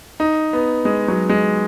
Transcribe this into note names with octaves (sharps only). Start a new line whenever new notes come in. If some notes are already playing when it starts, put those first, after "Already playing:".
D#4
B3
G#3
F#3
G#3